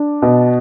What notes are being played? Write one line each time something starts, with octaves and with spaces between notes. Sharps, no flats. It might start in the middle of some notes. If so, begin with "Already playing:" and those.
Already playing: D4
B2